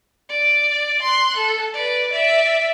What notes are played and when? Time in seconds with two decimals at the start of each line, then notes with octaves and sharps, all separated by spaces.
0.29 D5
1.02 C6 F#6
1.36 A4
1.73 B4 D5
2.12 D5 E5